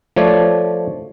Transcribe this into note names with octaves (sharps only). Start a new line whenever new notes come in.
F3 A3 C#5 D5